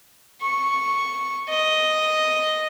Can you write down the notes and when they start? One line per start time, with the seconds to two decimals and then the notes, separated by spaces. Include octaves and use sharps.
0.41 C#6
1.49 D#5